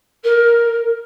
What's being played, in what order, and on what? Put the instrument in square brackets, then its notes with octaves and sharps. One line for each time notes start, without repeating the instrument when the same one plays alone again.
[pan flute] A#4